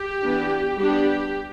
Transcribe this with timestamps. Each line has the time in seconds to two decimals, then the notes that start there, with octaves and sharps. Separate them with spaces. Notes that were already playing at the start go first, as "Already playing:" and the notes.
Already playing: G4
0.23 E3 B3 D4
0.77 G3 B3 D4 G4